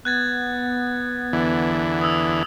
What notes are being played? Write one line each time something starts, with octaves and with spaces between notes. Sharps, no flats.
B3 F#6 G#6 A6
E2 D3 E3
D#6 E6